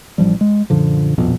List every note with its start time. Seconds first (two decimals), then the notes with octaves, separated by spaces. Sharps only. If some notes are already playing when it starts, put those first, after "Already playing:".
0.18 A1 F3 G3
0.41 G#3
0.70 F#2 A#2 D3 F3
1.18 D#1 A#1 F2 B2